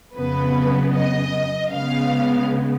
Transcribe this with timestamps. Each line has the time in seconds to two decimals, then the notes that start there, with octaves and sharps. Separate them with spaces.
0.15 F2 C#3 F#3 B3 B4
0.93 D#5
1.71 C#3 G#3 B3 F5